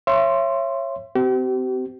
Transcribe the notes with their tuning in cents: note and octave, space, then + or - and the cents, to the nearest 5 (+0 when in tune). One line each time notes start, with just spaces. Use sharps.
C#5 -20 E5 +35 C6 +0
C4 -25 G4 -40